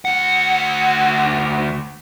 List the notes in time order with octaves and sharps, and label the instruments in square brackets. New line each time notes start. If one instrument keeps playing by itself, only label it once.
[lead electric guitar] D2 F#5